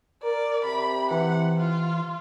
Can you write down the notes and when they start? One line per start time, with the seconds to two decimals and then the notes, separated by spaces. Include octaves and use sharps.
0.23 A#4 D5
0.65 C3 B5
1.11 E3 F#5
1.57 F4